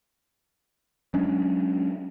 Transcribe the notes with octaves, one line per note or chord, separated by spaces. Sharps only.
F#3 G#3 C#4 D4